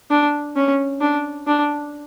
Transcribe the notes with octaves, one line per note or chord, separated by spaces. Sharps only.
D4
C#4
D4
D4